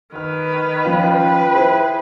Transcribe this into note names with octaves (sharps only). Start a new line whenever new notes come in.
D#3 B4 F6
F3 C#4 F4 G5
B4
E4 G#4 C5